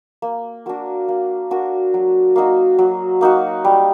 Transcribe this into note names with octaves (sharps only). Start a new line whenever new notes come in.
A#3
D4 F#4 A#4
A#3
D4 F#4 A#4
F#3
A#3 D#4 F#4
F#3
A#3 D#4 F#4
G3